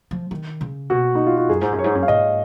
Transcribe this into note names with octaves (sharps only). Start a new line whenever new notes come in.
F3
D#3
C#3
B2 F#4
D#4
F4
F#4
F#2 G#4
G#2
F#2
C#5
G#2
F#2
F5
G#2 D#5